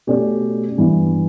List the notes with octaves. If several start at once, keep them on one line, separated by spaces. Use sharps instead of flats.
B2 A3 C#4 G4 D5
G2 E3 B3